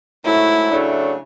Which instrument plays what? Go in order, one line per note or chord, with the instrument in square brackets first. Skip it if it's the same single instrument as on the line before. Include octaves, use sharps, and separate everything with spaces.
[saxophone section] G#2 F#3 A3 [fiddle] E4
[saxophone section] C#3 F#3 A3 D4